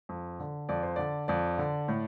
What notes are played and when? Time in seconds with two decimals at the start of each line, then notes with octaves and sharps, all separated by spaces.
0.09 F2
0.39 D3
0.69 F2 D5
0.83 C5
0.96 D3 D5
1.28 F2 D5
1.58 D3
1.88 A2